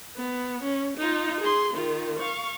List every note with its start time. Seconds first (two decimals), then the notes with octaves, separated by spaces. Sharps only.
0.17 B3
0.63 C#4
0.97 D#4 F4
1.40 G#4 C6
1.74 D#3 F4
2.19 F5 C#6